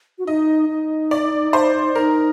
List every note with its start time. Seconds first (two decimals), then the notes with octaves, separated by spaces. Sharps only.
0.18 F#4
0.27 D#4 D#5
0.69 D#4
1.11 D5
1.53 C5
1.95 D#4 A#4